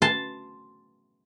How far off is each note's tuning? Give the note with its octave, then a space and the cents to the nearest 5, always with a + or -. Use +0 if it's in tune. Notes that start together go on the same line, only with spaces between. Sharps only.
A5 +0 C6 +0